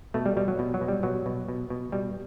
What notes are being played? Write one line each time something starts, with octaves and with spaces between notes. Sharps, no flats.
B2 A3
G3
B2 G3
F#3
B2
F#3
B2
G3
B2 F#3
B2
B2
B2
B2 G3